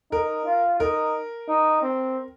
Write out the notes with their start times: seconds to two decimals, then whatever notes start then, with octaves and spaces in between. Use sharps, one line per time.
0.11 D#4 A#4
0.45 F4
0.80 D#4 A#4
1.49 D#4
1.82 C4